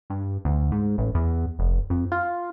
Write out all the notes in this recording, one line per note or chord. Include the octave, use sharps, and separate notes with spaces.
G2
D2
G#2
A1
E2
F1
F2
F4